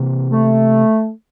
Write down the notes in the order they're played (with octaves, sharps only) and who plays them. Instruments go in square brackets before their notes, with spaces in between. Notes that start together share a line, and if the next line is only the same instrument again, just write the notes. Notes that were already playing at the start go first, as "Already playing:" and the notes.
Already playing: [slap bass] C3 E3 A#3
[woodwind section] A3